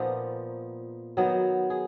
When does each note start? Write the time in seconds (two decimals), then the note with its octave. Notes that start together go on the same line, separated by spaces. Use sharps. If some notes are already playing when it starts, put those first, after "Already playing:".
Already playing: A#2 F3 B3 D#4 F4
1.17 D#3 F#3 B3 D#4
1.70 G#4